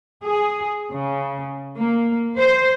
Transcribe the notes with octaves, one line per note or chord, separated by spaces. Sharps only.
G#4
C#3
A#3
C5